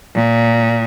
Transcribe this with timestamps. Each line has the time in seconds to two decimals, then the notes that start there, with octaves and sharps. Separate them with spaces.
0.15 A#2